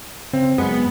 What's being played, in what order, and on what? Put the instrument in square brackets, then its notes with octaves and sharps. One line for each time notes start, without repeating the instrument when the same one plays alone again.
[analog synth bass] C#3 [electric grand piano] C4
[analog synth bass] F#2 [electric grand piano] G#3 [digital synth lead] B3